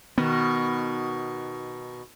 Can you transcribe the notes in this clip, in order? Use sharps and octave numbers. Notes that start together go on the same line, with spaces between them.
B2 D#3 B3